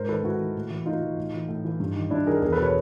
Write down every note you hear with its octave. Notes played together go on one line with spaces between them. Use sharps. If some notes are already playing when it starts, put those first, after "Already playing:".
Already playing: G#2 A#4 C5
D#3 A4 B4
G#2 E4 F#4
D#3
A2
E3
A2 D#4 F4
E3
A2
E3
A2
E3
G2
D#3
G2 D4 E4
D#3 G#4 A#4
E2 G#4 A#4
A4 B4
B2
B4 C#5